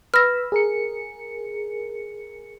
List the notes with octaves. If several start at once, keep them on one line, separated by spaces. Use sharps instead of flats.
B4 B5 E6 F6 A#6
G#4 A#4 C#7